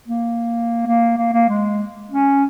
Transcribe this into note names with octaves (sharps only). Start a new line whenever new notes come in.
A#3
A#3
A#3
A#3
G#3
C#4